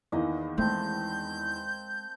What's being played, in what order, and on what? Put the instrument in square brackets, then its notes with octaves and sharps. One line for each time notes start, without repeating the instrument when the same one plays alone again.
[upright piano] E2 D#3 E3 [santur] A#3 D#5
[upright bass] G#3 A3 [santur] C4 F5 A5 [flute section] G6